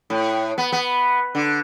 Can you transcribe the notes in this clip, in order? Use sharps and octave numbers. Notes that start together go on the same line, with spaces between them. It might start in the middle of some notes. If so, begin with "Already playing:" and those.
A2
B3
B3
D3